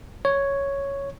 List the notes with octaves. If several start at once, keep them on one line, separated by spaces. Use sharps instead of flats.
C#5